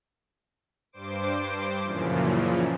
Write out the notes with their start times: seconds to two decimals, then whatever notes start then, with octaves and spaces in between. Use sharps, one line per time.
0.92 G2 C5 D6 D7
1.84 F#2 A#2 C#3 E3 F3